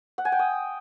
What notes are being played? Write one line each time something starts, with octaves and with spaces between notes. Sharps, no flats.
F#5
G#5
G5
D#6